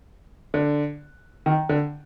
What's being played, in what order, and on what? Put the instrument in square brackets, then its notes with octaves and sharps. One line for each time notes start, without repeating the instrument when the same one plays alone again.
[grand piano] D3
D#3
D3